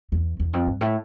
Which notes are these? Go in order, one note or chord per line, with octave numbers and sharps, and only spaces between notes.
E2
E2
F2
G2
A2